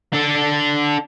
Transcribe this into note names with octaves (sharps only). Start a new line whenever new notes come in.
D4 A4